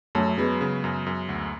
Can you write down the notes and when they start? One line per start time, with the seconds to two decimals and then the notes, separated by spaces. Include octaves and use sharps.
0.15 F#2 F#3 A3
0.38 F#3 G#3 B3
0.61 C#3
0.84 F#2
1.06 F#2
1.29 D2